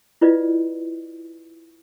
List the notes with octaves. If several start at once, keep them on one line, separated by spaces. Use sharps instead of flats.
E4 F4 B4 D5 D#5